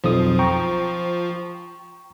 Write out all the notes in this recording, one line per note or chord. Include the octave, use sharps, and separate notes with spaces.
B1 F2 F3 D#6
G5 A#5 C#6